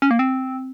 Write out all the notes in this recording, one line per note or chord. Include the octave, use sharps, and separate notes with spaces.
C#4
A#3
C4